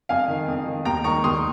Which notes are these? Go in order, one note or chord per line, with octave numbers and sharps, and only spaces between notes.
F2 F5 G#5
D#3
F2
D#3
D#2 G5 A#5
D#3 A#5 C#6
D#2 C6 D#6